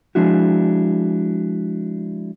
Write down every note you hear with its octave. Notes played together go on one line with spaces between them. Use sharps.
F3 G#3 D4 E4 F#4